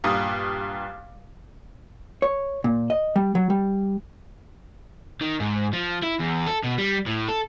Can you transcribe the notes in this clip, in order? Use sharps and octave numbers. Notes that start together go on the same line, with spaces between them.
G2 A#2 D#6
C#5
A#2
D#5
G3
F#3
G3
D#3
G#2
F3
E4
E2
A4
B2
G3
A2
A4